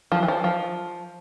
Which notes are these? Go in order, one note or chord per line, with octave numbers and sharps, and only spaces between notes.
F3
E3
F3
F3